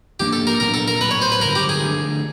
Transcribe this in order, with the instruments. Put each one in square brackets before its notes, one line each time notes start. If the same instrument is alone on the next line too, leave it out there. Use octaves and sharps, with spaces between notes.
[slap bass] G#2 F3 A#3 D4 [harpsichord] G4
[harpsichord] A4
A#4
[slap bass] A#2 F#3 B3 D4 [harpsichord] A#4
[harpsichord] A4
A#4
[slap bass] A2 F#3 B3 [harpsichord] B4
[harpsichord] C#5
C5
B4
[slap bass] G2 D3 F#3 [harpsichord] A#4
[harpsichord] G4
G#4
[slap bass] D3 F3 A3